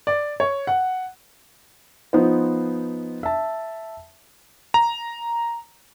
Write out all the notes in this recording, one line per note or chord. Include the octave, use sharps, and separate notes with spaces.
D5
C#5
F#5
F3 B3 D#4 F4 B4 C5
E5 A5
A#5